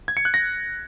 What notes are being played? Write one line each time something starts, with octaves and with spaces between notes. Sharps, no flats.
G#6
C#7
F#6
A#6